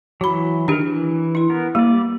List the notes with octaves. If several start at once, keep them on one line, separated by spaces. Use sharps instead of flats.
E3 F#3 F#4 B5
D#3 D4 G4 A#4
E3
E4 C6
B3 A#4
G3 A#3 D5